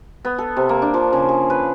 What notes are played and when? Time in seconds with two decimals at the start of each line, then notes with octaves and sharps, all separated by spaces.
0.25 B3
0.38 A4
0.57 C3
0.69 A#3
0.82 D4
0.94 F3
1.13 C#3
1.29 G#4
1.50 B4